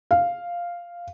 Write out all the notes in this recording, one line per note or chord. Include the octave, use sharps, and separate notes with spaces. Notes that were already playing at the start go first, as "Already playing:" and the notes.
F5